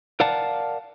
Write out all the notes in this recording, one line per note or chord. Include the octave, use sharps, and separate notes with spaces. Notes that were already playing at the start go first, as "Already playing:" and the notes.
A#4 D5 F5 F#5 A5